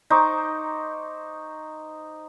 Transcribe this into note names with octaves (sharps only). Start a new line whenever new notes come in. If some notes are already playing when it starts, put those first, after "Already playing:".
D#4 C5 C#6 D6